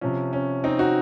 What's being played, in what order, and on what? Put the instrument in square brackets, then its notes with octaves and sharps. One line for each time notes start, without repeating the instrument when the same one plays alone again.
[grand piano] C3 F3 C#4
C#4
C4 D#4
D#4 F#4